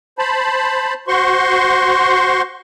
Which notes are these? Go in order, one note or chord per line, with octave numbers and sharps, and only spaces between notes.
C5 A5 B5
F#4 C5 C6 C#6